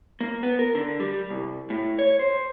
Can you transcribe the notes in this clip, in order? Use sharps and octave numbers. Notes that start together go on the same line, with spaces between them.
A#3
B3
A#4
D3
G3
C2
A2
C#5
C5